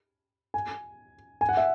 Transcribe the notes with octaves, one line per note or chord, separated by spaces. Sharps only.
G#5
G#5
F#5
E5